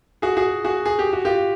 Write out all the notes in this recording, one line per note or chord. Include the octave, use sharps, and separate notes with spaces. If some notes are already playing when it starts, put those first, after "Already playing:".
F#4 G#4
F#4 G#4
F#4 G#4
G#4
G4
F#4
F4 G4